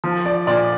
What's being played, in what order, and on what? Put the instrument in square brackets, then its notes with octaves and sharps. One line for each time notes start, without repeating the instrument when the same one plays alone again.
[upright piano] F3
D5
A#2 D5